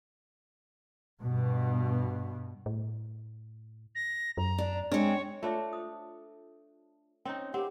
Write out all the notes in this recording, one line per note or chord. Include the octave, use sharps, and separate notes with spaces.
G2 B2
A2
A#6
F#2 A#5
D4
G#3 C4 D4 C#5
A3 D4 F4 A4 C#5 E5
C5 D#6
C4 C#4 D#4 C#5 G5
A#3 C4 C#4 G4 F#5